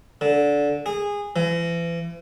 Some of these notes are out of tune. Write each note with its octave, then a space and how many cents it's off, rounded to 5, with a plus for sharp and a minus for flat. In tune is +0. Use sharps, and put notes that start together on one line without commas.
D3 -15
G#4 -20
E3 +40